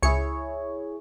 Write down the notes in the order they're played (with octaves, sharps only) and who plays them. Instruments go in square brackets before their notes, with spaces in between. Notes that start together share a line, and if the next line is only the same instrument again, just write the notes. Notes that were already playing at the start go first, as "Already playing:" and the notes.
[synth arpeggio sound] C#2 C#7 [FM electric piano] E4 G#4 C#5